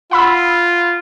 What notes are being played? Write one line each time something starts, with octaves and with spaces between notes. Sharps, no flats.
F4 F#5 B5 E6